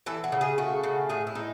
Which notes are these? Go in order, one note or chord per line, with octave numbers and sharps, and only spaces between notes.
E3 A4
F#4
C#3
G#4
A3 F#4
C#3
A2 G#4
E4
D#4